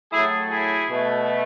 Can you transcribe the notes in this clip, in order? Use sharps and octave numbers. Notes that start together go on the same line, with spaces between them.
A2 F#3 A3 E4 G#4
E4 G#4
B2 A3